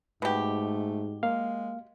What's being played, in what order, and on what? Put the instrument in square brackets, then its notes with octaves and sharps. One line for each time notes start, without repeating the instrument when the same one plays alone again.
[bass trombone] G#2 [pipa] B2 G4 [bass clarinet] A3
[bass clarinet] G#3 [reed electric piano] A#3 F5